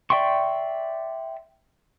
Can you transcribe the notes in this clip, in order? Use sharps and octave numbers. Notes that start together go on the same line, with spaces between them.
D5 E5 G5 C6 C#6